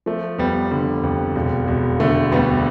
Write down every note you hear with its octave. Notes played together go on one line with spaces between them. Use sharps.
F3 A3
F1 G3 B3
D3 G3
F2
E1
E1
D3 A3
D2 G3 B3